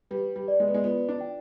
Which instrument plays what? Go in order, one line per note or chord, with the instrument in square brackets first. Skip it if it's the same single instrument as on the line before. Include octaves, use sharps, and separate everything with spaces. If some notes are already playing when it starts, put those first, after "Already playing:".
[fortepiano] G3 [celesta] B4
[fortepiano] G3
[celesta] D5
[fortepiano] G#3
B3
G#3
[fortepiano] B3 [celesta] F4
[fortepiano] D4
[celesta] G5